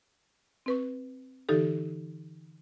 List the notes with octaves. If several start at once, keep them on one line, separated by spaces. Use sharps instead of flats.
C4 B4 C#6
D3 E3 D#4 G4 A4